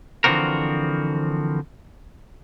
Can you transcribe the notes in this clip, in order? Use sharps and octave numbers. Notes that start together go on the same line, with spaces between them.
D3 E3 F3 C4 F#4 A#4